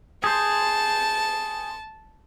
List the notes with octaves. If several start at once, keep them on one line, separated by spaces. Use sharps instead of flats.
G#4 C5 A5